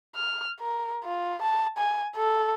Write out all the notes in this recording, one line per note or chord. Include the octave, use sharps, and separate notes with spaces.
F6
A#4
F4
A5
G#5
A4